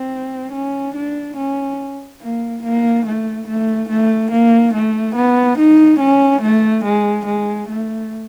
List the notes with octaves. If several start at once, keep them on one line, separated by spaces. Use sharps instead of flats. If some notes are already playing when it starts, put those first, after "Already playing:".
Already playing: C4
C#4
D4
C#4
A#3
A#3
A3
A3
A3
A#3
A3
B3
D#4
C#4
A3
G#3
G#3
A3